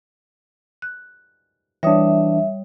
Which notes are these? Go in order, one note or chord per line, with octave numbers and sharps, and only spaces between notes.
F#6
E3 G3 D4 C#5 E5 D#6